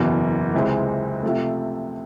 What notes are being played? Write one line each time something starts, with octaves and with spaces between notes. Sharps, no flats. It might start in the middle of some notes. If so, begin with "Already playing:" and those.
Already playing: F#1 E2 B2
C#2 C3 E3 G#3 C4
C3 F3 A3